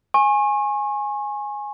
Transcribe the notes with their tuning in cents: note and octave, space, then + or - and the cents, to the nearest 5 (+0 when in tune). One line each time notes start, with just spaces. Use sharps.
G#5 +0 C#6 -35